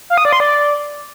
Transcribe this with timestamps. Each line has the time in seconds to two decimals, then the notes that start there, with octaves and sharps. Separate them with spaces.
0.10 F5
0.18 D#6
0.25 D5
0.33 C6
0.40 D5